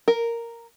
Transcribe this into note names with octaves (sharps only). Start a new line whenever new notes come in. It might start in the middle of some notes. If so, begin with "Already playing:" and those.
A#4